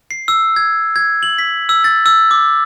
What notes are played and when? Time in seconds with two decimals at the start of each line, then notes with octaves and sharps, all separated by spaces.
0.11 C7
0.28 E6
0.56 G#6
0.96 G#6
1.23 F#7
1.38 B6
1.69 E6
1.84 A6
2.06 E6
2.31 D6